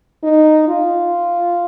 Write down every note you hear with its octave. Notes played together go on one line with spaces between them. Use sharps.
D#4
F4